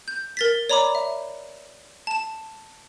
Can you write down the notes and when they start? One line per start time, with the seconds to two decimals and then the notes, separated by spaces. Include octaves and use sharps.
0.08 G6
0.37 A#4 A6 B6
0.69 C#5 D5 A#5 B5 D6
0.95 E5
2.07 A5 E7